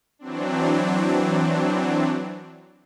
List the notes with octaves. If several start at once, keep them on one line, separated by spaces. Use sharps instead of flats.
E3 F#3 C4 D4